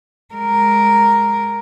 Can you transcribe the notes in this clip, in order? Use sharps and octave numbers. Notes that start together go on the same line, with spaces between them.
G#3 A#4